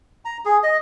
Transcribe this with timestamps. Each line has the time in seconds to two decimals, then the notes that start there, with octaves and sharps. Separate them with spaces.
0.25 A#5
0.45 G#4
0.63 D#5